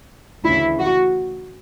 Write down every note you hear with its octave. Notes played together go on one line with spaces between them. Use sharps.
D2 C#3 E3 E4
F#4